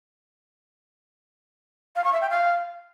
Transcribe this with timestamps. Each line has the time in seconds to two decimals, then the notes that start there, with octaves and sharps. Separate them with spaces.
1.96 F5
2.04 C#6
2.13 E5
2.21 G5
2.30 F5